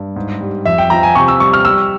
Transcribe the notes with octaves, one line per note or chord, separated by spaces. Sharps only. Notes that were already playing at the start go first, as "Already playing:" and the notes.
Already playing: G2
G#2
G3
F2 E5
G5
F3 A#5
G#5
C3 C#6
E6
G3 C#6
F6
G3 E6